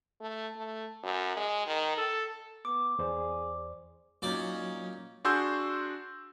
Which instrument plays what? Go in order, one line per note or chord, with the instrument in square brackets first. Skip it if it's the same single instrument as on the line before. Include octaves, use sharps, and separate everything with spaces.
[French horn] A3
A3
F#2
G#3
D#3
A4
[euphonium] B3 [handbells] D6
[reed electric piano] E2 C5 D5 [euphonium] G#4
[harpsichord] A#2 D5 [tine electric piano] F#3 [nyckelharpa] C#4 D#4
[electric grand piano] D4 F#4 G#4 C6 E6 G6